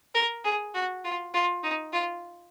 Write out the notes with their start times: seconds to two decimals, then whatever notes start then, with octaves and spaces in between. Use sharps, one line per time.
0.14 A#4
0.44 G#4
0.74 F#4
1.04 F4
1.34 F4
1.63 D#4
1.93 F4